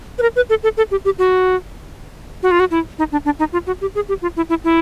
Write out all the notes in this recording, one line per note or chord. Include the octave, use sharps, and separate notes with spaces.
B4
A#4
B4
A4
A4
A4
G4
G4
F#4
F#4
F4
F#4
E4
D#4
D4
D4
D#4
F4
F#4
G4
G#4
G4
F4
E4
E4
E4